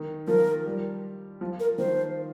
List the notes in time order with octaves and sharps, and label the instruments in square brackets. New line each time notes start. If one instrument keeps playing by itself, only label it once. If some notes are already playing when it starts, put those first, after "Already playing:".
Already playing: [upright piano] D#3
[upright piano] F3 [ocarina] A#4
[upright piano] G3
F3
[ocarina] A#4
[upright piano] D#3 [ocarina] C5